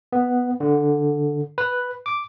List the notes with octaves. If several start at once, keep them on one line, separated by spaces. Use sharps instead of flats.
B3
D3
B4
D6